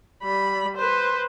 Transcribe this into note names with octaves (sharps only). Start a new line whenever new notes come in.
G3 B5
B4 C5